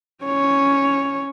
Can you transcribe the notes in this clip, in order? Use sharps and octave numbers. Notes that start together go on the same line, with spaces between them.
C#4 C#5